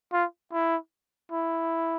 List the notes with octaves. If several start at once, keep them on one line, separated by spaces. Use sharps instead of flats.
F4
E4
E4